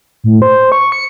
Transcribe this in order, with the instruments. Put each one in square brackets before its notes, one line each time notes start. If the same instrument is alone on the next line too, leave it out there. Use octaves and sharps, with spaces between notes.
[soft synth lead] A2
C5
C#6
C#7